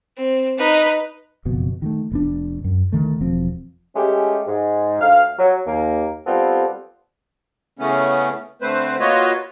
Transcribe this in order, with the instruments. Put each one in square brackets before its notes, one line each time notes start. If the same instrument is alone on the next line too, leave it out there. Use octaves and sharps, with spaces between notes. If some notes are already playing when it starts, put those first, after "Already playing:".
[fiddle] C4
D#4 B4
[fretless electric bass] F#1 F2 B2
D#3 F#3 A3
F1 B3 D4
F#2
D2 D#3 A3
E1 F3 C4
[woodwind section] G#3 A3 C#4 G4
G#2
D2 F5 F6
F#3
D#2 A#3
G3 B3 C4 F4 G4 A4
[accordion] C#3 E3 A3 B3 C#4
D3 A3 C4 B4 C5
A#3 F4 F#4 B4 C#5 D#5